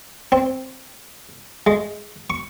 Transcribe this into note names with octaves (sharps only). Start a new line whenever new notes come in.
C4
G#3
C#6